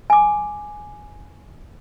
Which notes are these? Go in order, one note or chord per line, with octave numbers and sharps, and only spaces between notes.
G#5 D6